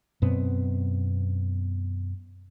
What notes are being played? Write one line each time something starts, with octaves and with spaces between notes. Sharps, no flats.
F#2 B2 B3 C4